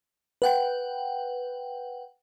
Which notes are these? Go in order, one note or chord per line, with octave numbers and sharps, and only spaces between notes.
B4 F#5 G5